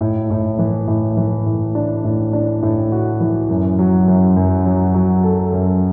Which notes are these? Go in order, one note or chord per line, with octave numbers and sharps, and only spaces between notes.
A2
A2
E3
A2
E3
A2
D4
A2
D4
A2
F#4
E3
F#2
F#3
F#2
F#2
F#3
F#3
A4
F#2